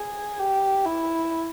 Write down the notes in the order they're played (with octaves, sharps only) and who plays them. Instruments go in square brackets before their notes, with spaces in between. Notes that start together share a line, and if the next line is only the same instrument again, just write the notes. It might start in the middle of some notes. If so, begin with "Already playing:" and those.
Already playing: [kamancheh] G#4
G4
E4